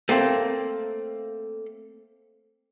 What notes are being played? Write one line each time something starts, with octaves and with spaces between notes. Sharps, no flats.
A3 A#3 C4